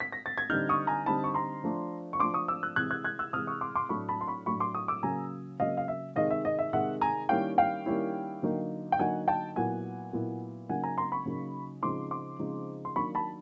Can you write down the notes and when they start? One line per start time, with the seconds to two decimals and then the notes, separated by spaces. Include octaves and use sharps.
0.00 B6
0.12 A#6
0.26 A6
0.38 G#6
0.50 D3 G3 C4 D#4 F6 G6
0.69 C#6 D#6
0.87 G#5 A#5
1.06 D3 G3 C4 D#4 A5 B5
1.24 C#6
1.34 A#5 C6
1.64 F3 A3 D4
2.13 C#6
2.19 F3 A3 D4 C6 D6
2.34 C#6 D#6
2.48 D6 E6
2.63 E6 F#6
2.76 C3 E3 G#3 F#6 G#6
2.91 F#6 G#6
3.05 F#6 G#6
3.19 E6 F#6
3.33 C3 E3 G#3 D#6 F6
3.47 C#6 D#6
3.61 C6 D6
3.75 C6 D6
3.89 A2 F#3 A3 D4 B5 C#6
4.09 A5 B5
4.21 C6
4.27 B5 C#6
4.46 A2 F#3 A3 D4 B5 C#6
4.60 C6 D6
4.75 C#6 D#6
4.88 D6 E6
5.03 C#3 F#3 A#3 G#5 A#5
5.60 C#3 F#3 A#3 D#5 F5
5.77 F5
5.88 E5
6.16 C3 D#3 G#3 D#5 F5
6.31 E5
6.45 D#5
6.59 E5
6.73 C3 D#3 G#3 E5 F#5
7.01 G#5 A#5
7.29 D#3 G3 A#3 C#4 E4 F5 G5
7.58 F5 G5
7.86 D#3 G3 A#3 C#4 E4
8.43 D3 F#3 A#3 D#4
8.92 G5
8.99 D3 F#3 A#3 D#4 F#5 G#5
9.28 G5 A5
9.56 A#2 F#3 B3 E4 F#5 G#5
10.13 A#2 F#3 B3 E4
10.69 C#3 F#3 A#3 D#4 F#5 G#5
10.84 G#5 A#5
10.98 A#5 C6
11.12 B5 C#6
11.26 C#3 F#3 A#3 D#4
11.83 C#3 F3 G#3 C4 D#4 C6 D6
12.11 C6 D6
12.39 C#3 F3 G#3 C4 D#4
12.85 C6
12.96 D#3 F#3 A#3 D4 B5 C#6
13.15 A5 B5